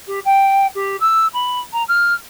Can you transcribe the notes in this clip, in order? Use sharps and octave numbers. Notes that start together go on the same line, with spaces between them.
G4
G5
G4
E6
B5
A#5
F6